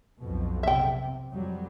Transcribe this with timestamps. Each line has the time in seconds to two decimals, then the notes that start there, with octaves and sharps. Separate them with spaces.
0.20 B1 F2 B2
0.63 C3 E5 G5
1.31 F2 F#3 G3